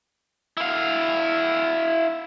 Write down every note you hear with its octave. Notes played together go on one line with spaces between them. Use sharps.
E4 F5